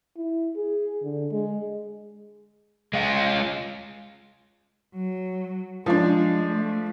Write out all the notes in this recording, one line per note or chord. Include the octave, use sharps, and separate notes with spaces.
E4
G#4
D3
G#3
G#3 F4
F#3
F3 G#3 D4
A3